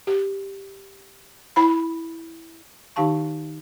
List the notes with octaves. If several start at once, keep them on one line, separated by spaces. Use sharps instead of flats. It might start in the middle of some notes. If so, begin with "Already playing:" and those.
G4
E4 B5
D#3 D#4 G4 F5 A5 C#6